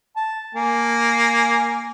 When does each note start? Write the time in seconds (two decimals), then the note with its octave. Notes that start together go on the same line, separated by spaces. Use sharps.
0.16 A5
0.55 A#3 G#5